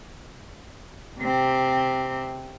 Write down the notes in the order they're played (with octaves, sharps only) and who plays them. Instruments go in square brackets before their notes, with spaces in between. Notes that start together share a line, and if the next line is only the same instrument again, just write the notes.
[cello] C3 C4